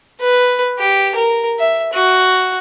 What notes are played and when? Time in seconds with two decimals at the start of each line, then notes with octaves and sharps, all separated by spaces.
0.20 B4
0.79 G4
1.15 A#4
1.59 E5
1.93 F#4